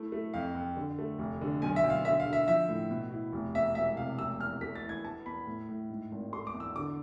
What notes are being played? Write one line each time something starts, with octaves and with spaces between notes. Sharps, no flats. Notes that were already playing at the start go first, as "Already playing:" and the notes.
Already playing: A3 E4
A3
F2 F5
F2
D3
A3
F1
D3
B1 G#5
E5
B1
F5
D3 E5
F5
D3
E5
F3 E5
A2
B2
E4
F1
E2 E5
E1 E5
C3 F5
F1 E6
E2 F6
A3 B6
A6
E3
G#6
B3 A5
E2 B5
A2
A2
G#2
G#1
A3 C6
D6
E2
E6
D3 D6